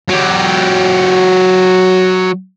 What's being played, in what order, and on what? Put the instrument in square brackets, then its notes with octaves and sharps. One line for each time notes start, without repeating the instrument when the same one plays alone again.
[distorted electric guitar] F#3 G4